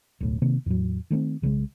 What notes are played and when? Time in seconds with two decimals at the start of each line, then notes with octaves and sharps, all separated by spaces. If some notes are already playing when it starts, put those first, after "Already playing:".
0.20 D1 B1 A2
0.42 C3 D#3 A#3
0.66 E2 A2 F#3
1.10 D#3 A3 B3 C4
1.42 B1 C#3 F3 G#3